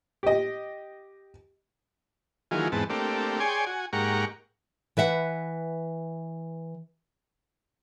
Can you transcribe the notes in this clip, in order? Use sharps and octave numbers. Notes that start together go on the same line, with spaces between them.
G4 D#5
D#3 E3 F#3 A#3 F4 G#4
E2 G#2 B3 C4 A5
A3 A#3 C4 D4 G4
G#4 C#5 D5 G5 G#5 C6
F#4 G#5
G#2 A#3 G4 F#5 A#5 C#6
E3 B4 E5 F#5